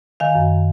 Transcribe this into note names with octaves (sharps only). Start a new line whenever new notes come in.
D#3 F5 G#5
F#2